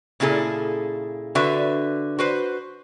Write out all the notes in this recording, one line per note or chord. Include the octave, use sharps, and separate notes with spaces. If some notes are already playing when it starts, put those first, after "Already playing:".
A#2 C#3 E4 G#4 A4
D3 F#4 B4 E5
F#4 B4 C5